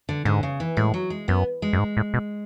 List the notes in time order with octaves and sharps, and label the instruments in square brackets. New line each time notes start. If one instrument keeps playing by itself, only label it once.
[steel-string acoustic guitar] D3
[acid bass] G#2 [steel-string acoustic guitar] D3
[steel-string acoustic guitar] C#3
E3
[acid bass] A2 [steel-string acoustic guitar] G#3
[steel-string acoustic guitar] F#3
G#3
[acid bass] F#2 [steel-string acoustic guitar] B3
[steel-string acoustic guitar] G#3
[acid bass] F#2
G#2
A2
B2